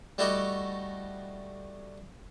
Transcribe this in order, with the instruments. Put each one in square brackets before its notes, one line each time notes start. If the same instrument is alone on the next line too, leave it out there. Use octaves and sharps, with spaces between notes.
[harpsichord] G3 A3 E4 F#4 G4 D#5